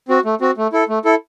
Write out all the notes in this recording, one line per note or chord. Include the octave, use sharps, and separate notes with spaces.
C4 F#4
A3
C4 F#4
A3
E4 A4
A3
E4 A4